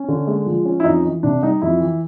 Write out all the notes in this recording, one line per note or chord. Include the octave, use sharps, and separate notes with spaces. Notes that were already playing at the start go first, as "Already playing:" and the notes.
Already playing: C#4
D3
G#3
F3
C#4
E4
F2 D#4
E3
C3 D4
G3 D#4
F2 E4
E3